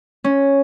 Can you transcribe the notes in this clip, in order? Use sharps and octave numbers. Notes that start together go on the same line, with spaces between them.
C#4